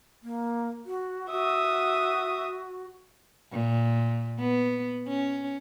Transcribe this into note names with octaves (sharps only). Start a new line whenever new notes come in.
A#3
F#4
F#4 E5 D#6
A#2
B3
C#4